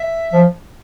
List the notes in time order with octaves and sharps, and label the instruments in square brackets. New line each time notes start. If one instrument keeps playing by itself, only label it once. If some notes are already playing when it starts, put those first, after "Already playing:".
Already playing: [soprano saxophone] E5
[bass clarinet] F3